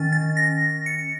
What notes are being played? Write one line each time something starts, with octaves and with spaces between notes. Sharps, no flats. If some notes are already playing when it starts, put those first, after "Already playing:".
Already playing: D#3 C#4 A6
A6
A#6
C#7